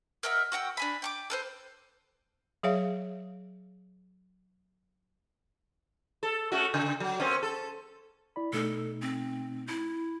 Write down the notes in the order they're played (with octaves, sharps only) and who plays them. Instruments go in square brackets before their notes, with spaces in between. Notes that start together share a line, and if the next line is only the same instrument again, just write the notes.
[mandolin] A#4 D#5 E5 F#5
F#4 F#5 G5 E6
D4 G#5 B5
G5 C#6 D6
A4 B4 C5
[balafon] F#3 G#4 C#5 E5 F5
[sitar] A4
A3 C#4 F#4
C#3
F#3
A#3 C4 C#4
A4
[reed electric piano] E4 D5 B5
[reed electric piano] B2 A3 D#4 [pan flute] A4
[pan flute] C4
E4